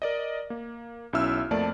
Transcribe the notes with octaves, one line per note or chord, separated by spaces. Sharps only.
A#4 D5 D#5
A#3
B1 C#4 E4 E5 E6 F6
F2 A3 A#3 D5 A5